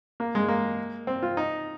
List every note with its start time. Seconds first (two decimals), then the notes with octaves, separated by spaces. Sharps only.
0.20 A#3
0.35 G#3
0.48 A#3
1.07 C4
1.23 F4
1.37 D#4